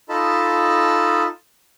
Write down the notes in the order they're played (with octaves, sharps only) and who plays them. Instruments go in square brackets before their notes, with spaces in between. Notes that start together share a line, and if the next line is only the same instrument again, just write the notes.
[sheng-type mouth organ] D#4 F4 A4 D#5 A5 B5